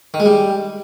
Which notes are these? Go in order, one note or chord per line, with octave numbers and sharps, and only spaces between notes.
D#3
G#3
G3